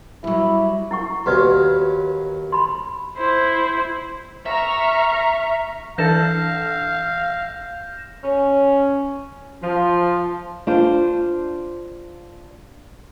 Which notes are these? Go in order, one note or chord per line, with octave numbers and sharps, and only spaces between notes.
F#3 G3 E4
E4 F#5 C#6
D#2 F#3 B3 F#4 B4 D5
B5 C6
E4 C5
E5 A#5 C#6 F6
E3 D4 A4 F5 G6 A#6 E7
C#4
F3
D4 F4 C5